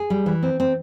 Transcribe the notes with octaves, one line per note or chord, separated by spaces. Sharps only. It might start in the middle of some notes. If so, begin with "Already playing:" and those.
Already playing: G#4
G3
E3
C4
C4